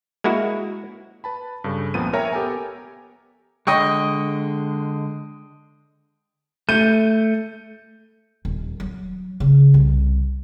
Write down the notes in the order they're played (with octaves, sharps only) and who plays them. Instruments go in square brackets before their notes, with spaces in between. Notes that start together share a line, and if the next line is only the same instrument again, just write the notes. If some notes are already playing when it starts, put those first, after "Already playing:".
[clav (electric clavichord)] G#3 A#3 E4 F#4
[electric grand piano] B4 A5 B5
G2 C#3 A4
C#2 A#2 F3 B3 D#7
A#4 C#5 E5 G5 G#5 A#5
B3 G4 A4 A#4 G#5 A#5
[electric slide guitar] D3 G#3 [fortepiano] D#5 G5 C#6
[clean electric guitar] A3 [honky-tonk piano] G6 D#7
[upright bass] D#1
F#3
C#3
C2